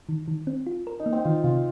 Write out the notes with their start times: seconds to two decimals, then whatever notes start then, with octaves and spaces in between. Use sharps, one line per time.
0.09 D#3
0.28 D#3
0.47 C4
0.66 F4
0.87 A#4
1.00 D#4
1.06 A#3
1.13 C4
1.24 D#3 F4
1.44 C3 F4